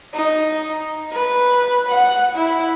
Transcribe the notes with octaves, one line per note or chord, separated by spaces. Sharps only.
D#4
B4
F#5
E4